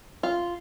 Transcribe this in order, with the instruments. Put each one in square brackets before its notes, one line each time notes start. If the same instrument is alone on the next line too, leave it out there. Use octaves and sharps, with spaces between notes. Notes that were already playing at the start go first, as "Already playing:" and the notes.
[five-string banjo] F4